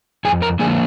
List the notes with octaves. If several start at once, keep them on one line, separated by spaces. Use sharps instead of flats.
F2 G#4 G#5
A#4 A#5
D3 F3 A#3 D4 G#4 G#5